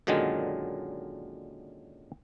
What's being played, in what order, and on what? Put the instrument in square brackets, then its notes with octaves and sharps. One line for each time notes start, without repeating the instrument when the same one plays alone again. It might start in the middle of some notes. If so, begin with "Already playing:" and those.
[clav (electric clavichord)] F#2 A#2 D3 D#3 F#3 G#3